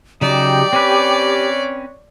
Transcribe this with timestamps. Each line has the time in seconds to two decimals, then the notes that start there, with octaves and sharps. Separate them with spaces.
0.21 C#3 F#3 D#4 G4 D5
0.73 C4 C#4 B4 C#5